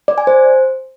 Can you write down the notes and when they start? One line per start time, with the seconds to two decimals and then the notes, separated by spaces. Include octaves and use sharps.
0.08 D5
0.18 G#5
0.27 C5